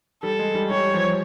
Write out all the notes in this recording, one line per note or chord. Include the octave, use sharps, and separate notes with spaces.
G3 A4
G#3
G3
G3 C#5
F3